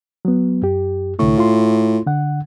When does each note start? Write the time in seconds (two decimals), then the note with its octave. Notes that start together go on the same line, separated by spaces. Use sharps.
0.25 F#3 B3
0.62 F#2 G4
1.19 C2 A2 D3 C#6
1.38 F4 C6
2.06 D3 F#5